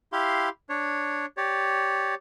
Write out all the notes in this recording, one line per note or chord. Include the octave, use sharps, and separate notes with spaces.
E4 G4 F5 C6
D4 C#5
G4 C#5 D5